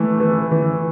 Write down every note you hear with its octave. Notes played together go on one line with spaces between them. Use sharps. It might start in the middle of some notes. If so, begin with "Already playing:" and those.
Already playing: E3 A3
E3
E3